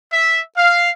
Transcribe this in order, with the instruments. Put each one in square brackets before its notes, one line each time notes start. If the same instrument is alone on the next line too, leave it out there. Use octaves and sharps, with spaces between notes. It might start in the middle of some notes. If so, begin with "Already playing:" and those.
[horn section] E5
F5